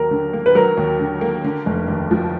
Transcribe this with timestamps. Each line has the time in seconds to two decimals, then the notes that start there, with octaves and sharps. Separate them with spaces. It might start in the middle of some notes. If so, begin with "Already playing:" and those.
Already playing: D#2 F#3 A#4
0.11 D3
0.33 A#3
0.46 B4
0.55 F#3 A#4
0.77 D#2
0.99 D3
1.21 A#3
1.44 D3
1.66 F1
1.88 D#2
2.11 F3